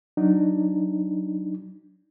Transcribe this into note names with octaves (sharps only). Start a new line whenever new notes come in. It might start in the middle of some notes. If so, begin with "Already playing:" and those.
F#3 D4 D#4